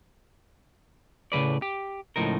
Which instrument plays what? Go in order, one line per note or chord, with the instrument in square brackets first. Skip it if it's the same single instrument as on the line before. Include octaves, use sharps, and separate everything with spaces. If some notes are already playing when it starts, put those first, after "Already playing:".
[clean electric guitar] A2 C#3 G#3 B4 D5
G4
C#2 A2 F3 D#4 A#4